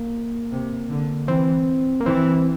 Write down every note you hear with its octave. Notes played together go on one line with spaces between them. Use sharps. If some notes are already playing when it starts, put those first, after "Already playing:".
Already playing: A#3
C3
D3
E3 C4
A#3
E3 C4